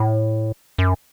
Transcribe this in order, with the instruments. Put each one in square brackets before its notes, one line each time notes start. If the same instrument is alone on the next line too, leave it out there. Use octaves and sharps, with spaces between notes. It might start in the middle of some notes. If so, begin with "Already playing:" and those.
Already playing: [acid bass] A2
F#2